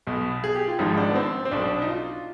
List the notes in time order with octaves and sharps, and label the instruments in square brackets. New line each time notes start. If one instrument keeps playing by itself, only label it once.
[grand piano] B1 B2
G#4
G4
F4
G#1 G#2 F3 D#4
D4
B3
C4
C4
B1 B2 D4
D#4
F4